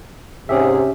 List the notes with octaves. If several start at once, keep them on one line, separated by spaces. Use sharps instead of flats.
G#2 C3 C#4 G4 G#4 E5